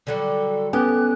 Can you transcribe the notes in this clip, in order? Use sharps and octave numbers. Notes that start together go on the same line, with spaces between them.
D3 F#3 G3 A4
B3 C#4 G4 A4 G#5 F#6